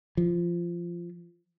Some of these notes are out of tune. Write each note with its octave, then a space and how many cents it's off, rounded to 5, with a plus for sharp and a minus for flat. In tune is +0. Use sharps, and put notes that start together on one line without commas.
F3 -15